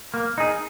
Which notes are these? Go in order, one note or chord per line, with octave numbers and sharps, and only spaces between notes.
A#3
D#4 G#4